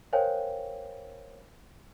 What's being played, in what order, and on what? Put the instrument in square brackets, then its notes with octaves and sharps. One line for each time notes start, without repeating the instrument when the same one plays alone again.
[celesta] A#4 C5 C#5 F5 G5 G#5